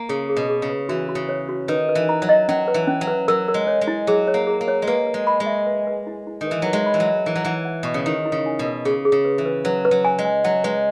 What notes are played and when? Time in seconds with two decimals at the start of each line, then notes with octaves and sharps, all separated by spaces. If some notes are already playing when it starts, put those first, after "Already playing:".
Already playing: A#3
0.09 C#3 G#4
0.29 G#4
0.36 B2
0.49 G#4
0.62 C#3
0.69 B4
0.89 E3 F#4
1.09 F#4
1.15 C#3
1.29 C#5
1.49 F#4
1.68 D#3 B4
1.89 B4
1.95 E3
2.09 A#5
2.22 F#3
2.29 D#5
2.48 F#3 C#4
2.68 B4
2.74 E3
2.87 C#4
3.01 F#3
3.07 B4
3.28 F#3 A#4
3.48 A#4
3.54 G#3
3.67 C#5
3.81 G#3
3.87 E4
4.07 F#3 G#4
4.27 C#5
4.34 A#3
4.47 G#4
4.61 A#3
4.68 C#5
4.82 G#3
4.87 A#3 B4
5.07 B4
5.14 G#3
5.27 B5
5.40 G#3
5.47 E5
5.66 B4
5.87 B4
6.07 E4
6.27 E4
6.41 D#3
6.47 E3 B4
6.62 F#3 B4
6.73 G#3
6.86 B5
6.94 E3
7.00 F#3
7.07 E5
7.26 E3 A#4
7.35 F#3
7.45 E3 F#5
7.65 F#5
7.83 B2 C#6
7.94 C#3
8.06 D#3 E4
8.25 E4
8.32 C#3
8.46 G#5
8.59 B2
8.65 A#4
8.85 C#3 G#4
9.05 G#4
9.12 C#3
9.25 B4
9.38 E3
9.45 B4
9.65 F#3 B4
9.85 B4
9.91 F#3
10.05 G#5
10.19 G#3
10.25 G#5
10.44 F#3 F#5
10.64 G#3 B4